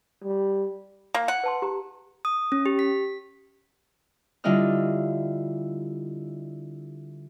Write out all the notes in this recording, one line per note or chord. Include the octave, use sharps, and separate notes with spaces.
G3
A#3
F#5
B4 A5 C6
G4 A#5
D#6
C#4
G4
B6
D3 G3 E4 F4 D#5 F6